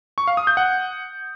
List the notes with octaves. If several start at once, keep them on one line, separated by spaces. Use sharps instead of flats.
C#6
F5
D#6
G6
F#5